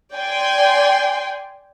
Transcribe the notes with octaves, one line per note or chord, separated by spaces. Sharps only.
D5 G5 G#5 C6